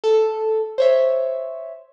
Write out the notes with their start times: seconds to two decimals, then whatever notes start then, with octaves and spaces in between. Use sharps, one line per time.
0.04 A4
0.78 C5 C#5 E5